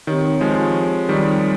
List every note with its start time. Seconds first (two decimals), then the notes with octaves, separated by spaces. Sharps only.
0.07 D#3 C4 G4 C#5
0.41 F3 G#3
1.09 D#3 G3